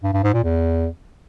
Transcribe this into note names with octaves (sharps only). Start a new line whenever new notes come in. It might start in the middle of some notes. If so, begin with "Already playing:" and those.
G2
G2
G#2
A#2
E2